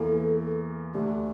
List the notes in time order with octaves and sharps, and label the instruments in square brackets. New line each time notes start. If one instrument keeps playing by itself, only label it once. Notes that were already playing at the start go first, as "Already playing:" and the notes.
Already playing: [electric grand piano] E2 E3 A#3 [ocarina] A4
[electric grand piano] D2 D3 A3 D4 [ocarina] G4